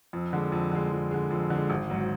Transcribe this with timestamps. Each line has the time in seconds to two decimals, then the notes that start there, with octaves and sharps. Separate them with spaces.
0.13 F2
0.33 D3 G#3
0.52 F2
0.72 D3 G#3
0.91 F2
1.11 D3 G#3
1.31 F2
1.50 D3 G#3
1.70 G#1
1.90 G#2 F#3